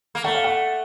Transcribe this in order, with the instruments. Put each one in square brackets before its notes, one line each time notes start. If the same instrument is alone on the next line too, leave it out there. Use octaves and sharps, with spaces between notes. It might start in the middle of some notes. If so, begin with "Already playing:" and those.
[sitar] A#3
[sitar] A3 [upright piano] F#5
[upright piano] F5
F#5